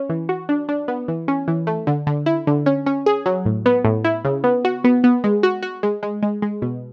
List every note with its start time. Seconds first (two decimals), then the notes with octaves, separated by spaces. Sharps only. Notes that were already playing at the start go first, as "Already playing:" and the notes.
Already playing: C#4
0.09 E3
0.29 F#4
0.49 D4
0.69 D4
0.88 B3
1.08 E3
1.28 C#4
1.48 E3
1.67 A3
1.87 D3
2.07 D3
2.26 E4
2.47 D3
2.66 C#4
2.86 C#4
3.06 G#4
3.26 F#3
3.46 A2
3.66 B3
3.84 A2
4.04 E4
4.25 C#3
4.44 B3
4.65 F#4
4.84 B3
5.04 B3
5.24 G#3
5.43 F#4
5.63 F#4
5.83 G#3
6.03 G#3
6.22 G#3
6.42 G#3
6.62 B2